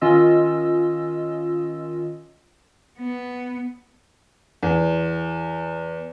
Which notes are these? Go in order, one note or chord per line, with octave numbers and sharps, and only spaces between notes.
D#3 C#4 F4 D#5 E6
B3
E2